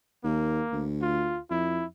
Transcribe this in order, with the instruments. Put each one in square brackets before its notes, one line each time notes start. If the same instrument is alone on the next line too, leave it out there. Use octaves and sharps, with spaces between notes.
[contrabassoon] D#2 [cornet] A#3
[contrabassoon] D2
[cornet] F4
[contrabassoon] F2 [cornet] E4